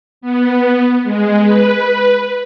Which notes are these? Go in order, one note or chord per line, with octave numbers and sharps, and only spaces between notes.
B3
G#3
B4